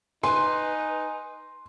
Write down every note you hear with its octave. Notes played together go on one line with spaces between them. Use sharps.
D#4 B4 G#5 C6